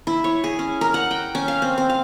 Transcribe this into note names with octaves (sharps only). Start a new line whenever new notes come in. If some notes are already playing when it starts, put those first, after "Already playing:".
E4
C#5
G#4
C#4
A#4
F#5
G5
C#4
F5
C4
C4
F5